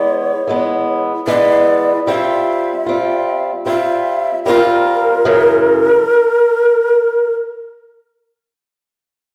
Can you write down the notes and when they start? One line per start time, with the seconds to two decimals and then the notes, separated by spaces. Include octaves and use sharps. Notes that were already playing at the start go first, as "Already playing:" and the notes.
Already playing: E3 G#3 B3 C#5
0.47 E3 G#3 B3
1.27 E3 G#3 B3 D5
2.07 G3 C4 F4 E5
2.86 G3 C4 F4
3.66 G3 C4 F4 E5
4.45 G3 C4 F4 A#4
5.25 F#2 C#3 E3